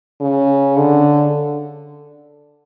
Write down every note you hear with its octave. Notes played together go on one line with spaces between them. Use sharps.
C#3
D3